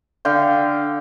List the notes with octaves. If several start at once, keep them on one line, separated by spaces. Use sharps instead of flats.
D3 F5 G5